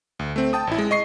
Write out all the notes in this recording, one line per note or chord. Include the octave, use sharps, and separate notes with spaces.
D2
A3 C4
G5 A5 D#6
A1 E4
G#3
D#5 C#6 C7